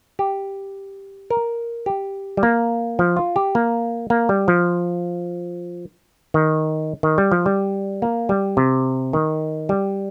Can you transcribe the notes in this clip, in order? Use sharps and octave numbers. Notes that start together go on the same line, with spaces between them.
G4
A#4
G4
G3
A#3
F3
F4
G4
A#3
A#3
G3
F3
D#3
D#3
G3
F3
G3
A#3
G3
C3
D#3
G3